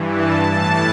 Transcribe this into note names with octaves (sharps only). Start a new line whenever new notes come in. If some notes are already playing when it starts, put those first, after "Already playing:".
Already playing: G2 E3
A5
A2 E3 A5